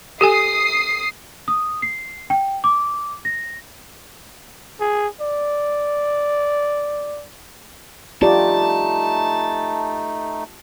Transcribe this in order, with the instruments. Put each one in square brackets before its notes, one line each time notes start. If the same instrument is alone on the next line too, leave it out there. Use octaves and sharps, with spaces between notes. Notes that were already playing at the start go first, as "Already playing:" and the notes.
[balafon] G4 A4 G#5 [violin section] D#6 C7
[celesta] D#6
C7
G5
D6
A#6
[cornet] G#4
D5
[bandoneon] A3 D#4 [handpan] F4 G4 D5 [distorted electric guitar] A5